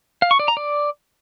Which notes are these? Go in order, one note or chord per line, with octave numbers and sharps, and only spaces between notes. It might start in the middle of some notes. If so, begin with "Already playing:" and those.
F5
C#6
D5
A#5
D5